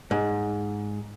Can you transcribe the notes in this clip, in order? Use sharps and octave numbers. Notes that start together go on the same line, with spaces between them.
G#2